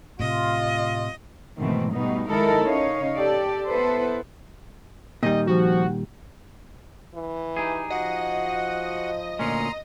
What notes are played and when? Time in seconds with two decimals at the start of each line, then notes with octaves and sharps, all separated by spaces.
0.20 A2 C3 F4 D#5
1.58 G#2 B2 D#3 E3 A3 C4
1.92 B2 G3 A3 B3 D#4
2.29 D#3 G#3 D#4 E4 A4 A#4
2.65 C#3 C#4 D#4 C#5 D#5 F5
3.17 G4 A4 D5
3.67 B3 E4 A4 B4 C5
5.23 A#2 D#3 G3 D#5
5.47 F3 F#4
7.14 E3
7.57 D#4 G4 G#4
7.90 F3 F#4 D#5 F#5
9.39 D2 A#2 C#4 A#5 C6